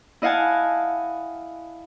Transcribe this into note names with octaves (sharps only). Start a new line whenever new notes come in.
E4 D#5 F5 F#5 G#5 A5